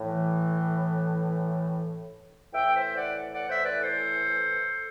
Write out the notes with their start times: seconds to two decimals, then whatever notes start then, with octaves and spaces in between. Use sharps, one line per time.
0.01 A2 E3
2.54 A2 E3 E5 G5
2.75 C5 E5
2.96 D5 F#5
3.33 D5 F#5
3.49 C5 E5
3.65 B4 D5
3.80 A4 C5